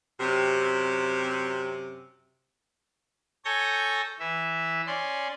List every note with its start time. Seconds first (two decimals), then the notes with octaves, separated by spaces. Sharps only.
0.20 F#2 C3
3.45 A4 C#5 G#5 G6 A#6
4.20 E3 E5
4.87 C#4 D5 C6